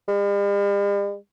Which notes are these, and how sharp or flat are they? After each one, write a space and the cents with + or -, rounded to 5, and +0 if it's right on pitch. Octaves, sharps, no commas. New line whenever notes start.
G3 +45